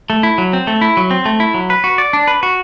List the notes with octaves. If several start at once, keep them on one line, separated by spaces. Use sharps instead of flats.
A3
E4
F#3
C4
A3
E4
F#3
C4
A3
E4
F#3
B4
F#4
D5
D4
B4
F#4